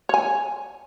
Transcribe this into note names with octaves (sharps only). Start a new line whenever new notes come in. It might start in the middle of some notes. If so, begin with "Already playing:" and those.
C#5 G#5